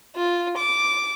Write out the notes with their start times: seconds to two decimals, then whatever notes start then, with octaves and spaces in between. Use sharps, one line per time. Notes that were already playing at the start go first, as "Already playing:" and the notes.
0.16 F4
0.58 D6